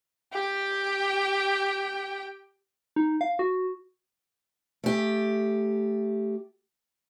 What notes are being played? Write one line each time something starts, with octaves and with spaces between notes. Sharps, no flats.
G4 G5
D#4
F5
F#4
A3 G4